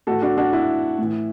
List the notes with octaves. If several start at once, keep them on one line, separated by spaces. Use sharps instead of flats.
A2 E3 F#4 A4
D4 F#4
D4 F#4
E4
A2 E3